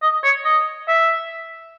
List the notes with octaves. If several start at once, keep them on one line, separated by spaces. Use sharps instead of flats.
D#5
C#5
D#5
E5